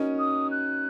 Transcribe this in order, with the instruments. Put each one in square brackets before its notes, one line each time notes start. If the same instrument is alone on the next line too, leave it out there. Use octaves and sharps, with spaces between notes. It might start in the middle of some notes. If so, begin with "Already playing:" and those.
Already playing: [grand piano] C#4 D#4 F#4 A#4
[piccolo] D#6
F#6